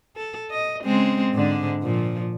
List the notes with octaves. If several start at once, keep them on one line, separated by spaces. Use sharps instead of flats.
A4
D#5
C#3 G#3 C4
G#2 D3 D4
A#2 F3